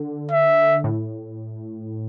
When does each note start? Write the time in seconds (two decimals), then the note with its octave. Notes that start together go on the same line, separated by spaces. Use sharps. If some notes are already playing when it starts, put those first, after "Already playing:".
Already playing: D3
0.31 E5
0.84 A2